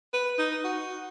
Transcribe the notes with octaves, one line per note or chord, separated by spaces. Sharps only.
B4
D#4
F#4